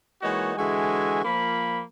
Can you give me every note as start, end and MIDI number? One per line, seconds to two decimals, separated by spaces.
0.22 0.52 52
0.22 0.52 56
0.22 0.52 58
0.22 0.52 63
0.22 0.52 66
0.22 0.52 73
0.57 1.21 50
0.57 1.21 52
0.57 1.21 56
0.57 1.21 66
0.57 1.21 76
0.57 1.21 80
1.24 1.82 53
1.24 1.82 58
1.24 1.82 83